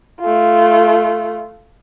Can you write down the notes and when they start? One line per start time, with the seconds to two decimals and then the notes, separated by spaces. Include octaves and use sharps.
0.21 A3 F4